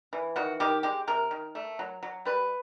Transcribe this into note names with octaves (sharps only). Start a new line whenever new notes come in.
E3
D#3 F#4
D#3 G4
G#3 G4
C3 A#4
D#3
A3
F#3
F#3
G3 B4